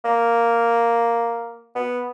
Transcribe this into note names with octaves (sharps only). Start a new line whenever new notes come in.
A#3
B3